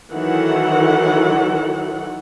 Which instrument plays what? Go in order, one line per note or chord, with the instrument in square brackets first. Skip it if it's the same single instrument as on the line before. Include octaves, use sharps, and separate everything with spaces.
[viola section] D#3 E3 F#3 A4 F#5